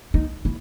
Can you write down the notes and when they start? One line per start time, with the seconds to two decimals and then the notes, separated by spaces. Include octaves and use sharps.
0.14 D#4
0.45 E4